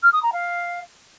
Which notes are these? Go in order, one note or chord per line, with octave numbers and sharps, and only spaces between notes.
F6
D#6
A#5
F5